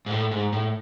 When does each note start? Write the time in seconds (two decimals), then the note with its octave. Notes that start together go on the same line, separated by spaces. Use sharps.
0.06 G#2
0.11 A2
0.31 G#2
0.53 A2